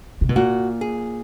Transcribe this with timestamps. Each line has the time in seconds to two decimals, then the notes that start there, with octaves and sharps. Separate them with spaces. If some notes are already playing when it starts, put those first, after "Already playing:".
0.21 C3
0.29 B2
0.36 A#2 F#4
0.81 G#4